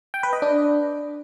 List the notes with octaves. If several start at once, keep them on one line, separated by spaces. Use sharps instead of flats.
G5
B4
D#5
D4